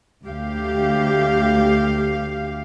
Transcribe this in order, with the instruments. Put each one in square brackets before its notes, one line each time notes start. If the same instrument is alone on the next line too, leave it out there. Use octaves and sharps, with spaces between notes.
[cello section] D2 G4 F5